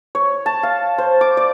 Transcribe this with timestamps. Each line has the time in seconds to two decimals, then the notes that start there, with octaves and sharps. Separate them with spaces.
0.15 C#5
0.46 A5
0.63 F5
0.98 C5
1.21 D6
1.37 D5